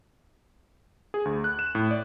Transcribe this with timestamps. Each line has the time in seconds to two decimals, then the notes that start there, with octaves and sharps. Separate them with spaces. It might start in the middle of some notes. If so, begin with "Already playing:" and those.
1.14 G#4
1.25 D2
1.44 F#6
1.59 E7
1.75 A2
1.91 D5